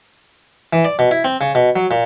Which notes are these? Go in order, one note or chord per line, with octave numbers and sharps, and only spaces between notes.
E3
D5
B2
E4
C4
C#3
B2
F#3
A#2